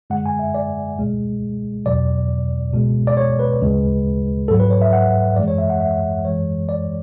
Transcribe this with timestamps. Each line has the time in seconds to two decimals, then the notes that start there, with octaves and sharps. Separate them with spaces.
0.10 F#2 D3 G#3 F#5
0.26 G#5
0.39 E5
0.54 D5
0.98 C#2 B2 G#3
1.86 E2 B2 F#3 D5
2.74 C#2 B2 G#3
3.07 D5
3.17 C#5
3.39 B4
3.62 D2 C#3 G#3
4.48 G#2 F#3 A4
4.60 B4
4.71 C#5
4.82 E5
4.93 F#5
5.36 F#2 E3 G#3 D5
5.48 C#5
5.58 E5
5.70 F#5
5.80 E5
6.25 F#2 E3 G#3 C#5
6.69 D5